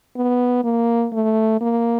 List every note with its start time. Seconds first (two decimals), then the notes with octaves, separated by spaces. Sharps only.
0.16 B3
0.64 A#3
1.13 A3
1.61 A#3